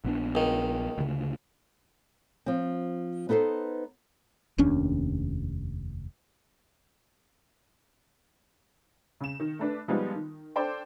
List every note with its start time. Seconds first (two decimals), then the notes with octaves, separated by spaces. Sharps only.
0.04 A#1 B3 D4
0.35 C#2 D#3
0.98 D2 C#3
2.46 F3 C4
3.29 B3 D#4 A4 B4 C5
4.58 F1 D#2 C#4 D4
9.20 C#3 E7
9.40 D#3
9.59 A3 D4 B4
9.88 F3 G3 G#3 B3 D#4 F4
10.14 D#3
10.56 D4 A4 C5 D5 G5